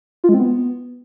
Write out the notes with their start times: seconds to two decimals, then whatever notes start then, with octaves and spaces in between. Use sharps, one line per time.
0.24 F4
0.29 G#3
0.34 C4
0.39 B3